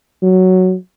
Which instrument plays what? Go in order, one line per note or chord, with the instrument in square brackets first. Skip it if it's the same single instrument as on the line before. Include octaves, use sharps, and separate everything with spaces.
[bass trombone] F#3